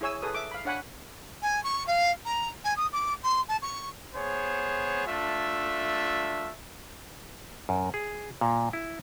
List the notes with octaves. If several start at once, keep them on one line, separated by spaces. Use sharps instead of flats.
E4 G#4 C#5 G#5 E6
G#4 A4 B4 D#6
E5 D6
F5 B5
D4 C#5 F#5 G#5 B5
G#5
C#6
F5
A#5
G#5
D#6
D6
C6
A5
C#6
B3 G#4 C5 C#5
A3 D4 F4 E5
F#2
G#4
A#2
E4